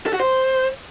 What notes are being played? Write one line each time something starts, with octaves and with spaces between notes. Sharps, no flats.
A4
F#4
C5